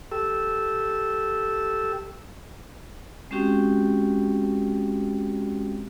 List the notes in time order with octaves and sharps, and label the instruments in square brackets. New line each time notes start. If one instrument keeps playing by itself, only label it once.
[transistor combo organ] G4 A4 E6
[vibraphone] G#3 C4 C#4 F#4 G4 G5